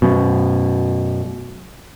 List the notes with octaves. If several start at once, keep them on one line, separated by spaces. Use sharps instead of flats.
F#2 B2